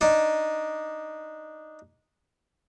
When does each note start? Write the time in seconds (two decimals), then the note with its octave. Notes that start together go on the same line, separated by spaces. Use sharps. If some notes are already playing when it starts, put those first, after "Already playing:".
0.01 D4 D#4 D#5